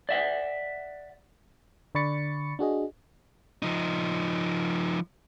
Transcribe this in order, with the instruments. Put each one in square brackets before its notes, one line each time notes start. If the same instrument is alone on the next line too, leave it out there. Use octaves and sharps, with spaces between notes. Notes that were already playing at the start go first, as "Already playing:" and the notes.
[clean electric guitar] D5 E5 F#5
[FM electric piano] D3 D5 B5 C#6 A6 C#7
D4 F#4 G#4 D#5
[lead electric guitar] F3 D#4